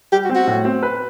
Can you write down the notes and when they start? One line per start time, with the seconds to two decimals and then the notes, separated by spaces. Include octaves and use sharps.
0.12 G3 G4
0.25 F#4
0.29 C4
0.35 F#4
0.47 A2
0.65 C4
0.83 B4